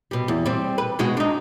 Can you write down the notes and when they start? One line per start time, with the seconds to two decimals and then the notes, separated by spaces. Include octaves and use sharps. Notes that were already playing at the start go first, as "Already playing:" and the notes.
0.11 B2 G3
0.28 E2
0.46 G3 C4
0.78 B4
0.99 B2 G#3 F#4
1.17 D4 D#4